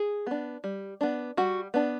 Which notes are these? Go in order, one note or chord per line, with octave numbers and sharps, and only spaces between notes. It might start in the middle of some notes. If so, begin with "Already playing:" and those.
Already playing: G#4
B3 D4
G3
B3 D4
G3 F#4
B3 D4